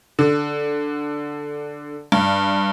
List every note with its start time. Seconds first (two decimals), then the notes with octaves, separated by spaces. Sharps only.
0.19 D3
2.12 G2